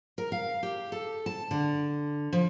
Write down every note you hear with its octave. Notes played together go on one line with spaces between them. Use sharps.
A#4
F5
G4
A4
A5
D3
F3